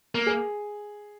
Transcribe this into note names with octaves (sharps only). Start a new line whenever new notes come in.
A#3
G#4